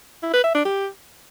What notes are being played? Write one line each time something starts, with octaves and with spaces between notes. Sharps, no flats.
E4
B4
E5
D4
G4